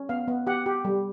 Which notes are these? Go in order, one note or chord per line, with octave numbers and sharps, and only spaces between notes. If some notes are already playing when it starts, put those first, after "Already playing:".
Already playing: C#4
B3 F5
B3
G4 F#5
G4
G3